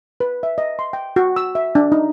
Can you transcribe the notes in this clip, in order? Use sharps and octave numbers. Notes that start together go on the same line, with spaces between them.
B4
E5
D#5
C6
G5
F#4
E6
E5
D4
D#4